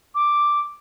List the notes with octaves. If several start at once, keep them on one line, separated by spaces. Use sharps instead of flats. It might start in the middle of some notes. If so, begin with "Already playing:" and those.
D6